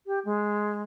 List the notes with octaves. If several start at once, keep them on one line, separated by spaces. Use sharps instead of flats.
G4
G#3